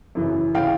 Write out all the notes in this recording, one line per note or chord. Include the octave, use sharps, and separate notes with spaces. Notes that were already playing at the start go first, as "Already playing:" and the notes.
F#2 C#3 E3
C#3 E3 F5 G5